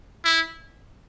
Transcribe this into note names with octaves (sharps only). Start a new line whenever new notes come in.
E4